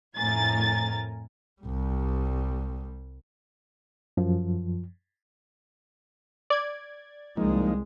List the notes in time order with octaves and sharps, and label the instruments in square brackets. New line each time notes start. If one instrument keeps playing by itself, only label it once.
[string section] F2 A2 A#4 G#5 A6
[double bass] C2 G3
[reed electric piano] F#2 F3
[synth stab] D5 G#6
[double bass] C2 G#3 [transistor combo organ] F3 A#3 D#4